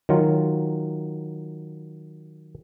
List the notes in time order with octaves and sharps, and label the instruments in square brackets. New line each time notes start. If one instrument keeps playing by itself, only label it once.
[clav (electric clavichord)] D#3 F#3 F4